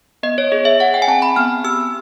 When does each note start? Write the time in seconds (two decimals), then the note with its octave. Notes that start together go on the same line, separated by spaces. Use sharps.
0.23 B3 D#5
0.38 C#5
0.52 G#4 D#5
0.65 E5
0.80 G#4 F#5
0.94 G5
1.02 G#5
1.08 C4 A5
1.22 B5
1.36 B3 F6
1.64 G4 E6